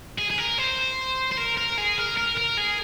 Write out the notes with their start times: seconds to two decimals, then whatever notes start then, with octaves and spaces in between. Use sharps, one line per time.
0.18 G#4
0.30 G#4
0.38 A#4
0.58 C5
1.32 C5
1.38 A#4
1.58 A#4
1.78 G#4
1.98 A#4
2.17 A#4
2.37 A#4
2.57 G#4